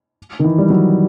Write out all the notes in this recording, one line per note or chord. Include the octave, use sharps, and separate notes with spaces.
D#3
E3
G3
F#3